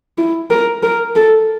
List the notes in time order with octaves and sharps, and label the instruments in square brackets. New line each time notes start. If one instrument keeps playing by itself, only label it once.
[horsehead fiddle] E4
A#4
A#4
A4